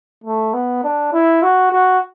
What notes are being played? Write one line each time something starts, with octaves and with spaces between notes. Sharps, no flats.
A3
B3
D4
E4
F#4
F#4